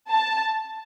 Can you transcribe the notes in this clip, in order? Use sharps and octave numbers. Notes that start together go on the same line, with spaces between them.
A5